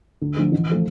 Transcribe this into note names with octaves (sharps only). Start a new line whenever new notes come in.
D2
D3 F3 A3
A1
F3 A3